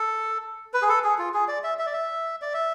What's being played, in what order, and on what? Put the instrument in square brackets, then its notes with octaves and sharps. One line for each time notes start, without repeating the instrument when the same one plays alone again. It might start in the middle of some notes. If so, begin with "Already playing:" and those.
Already playing: [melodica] A4
B4
G#4
A4
G#4
F4
G#4
D5
E5
E5
D5
E5
D5
E5